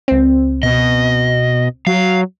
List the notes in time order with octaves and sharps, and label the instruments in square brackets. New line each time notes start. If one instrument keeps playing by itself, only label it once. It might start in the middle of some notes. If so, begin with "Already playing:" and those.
[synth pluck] C#2 C4
[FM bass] B2 [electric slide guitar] D#5
[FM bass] F#3 [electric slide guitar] F5